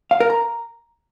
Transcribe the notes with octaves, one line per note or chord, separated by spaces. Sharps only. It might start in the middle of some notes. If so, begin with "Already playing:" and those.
F5
A#4
A#5